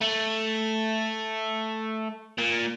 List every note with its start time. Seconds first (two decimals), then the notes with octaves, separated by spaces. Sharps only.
0.01 A3
2.38 A#2